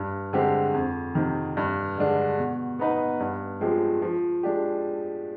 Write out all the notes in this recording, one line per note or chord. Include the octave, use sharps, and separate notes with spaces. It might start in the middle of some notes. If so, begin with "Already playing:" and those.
Already playing: G2
D3 G#3 C4 G4
F2
C3 D#3
G2
D3 G#3 D4
B2
B3 D#4 B4
G2
F3 G#3 C4 G4
F3
G#3 D4 G4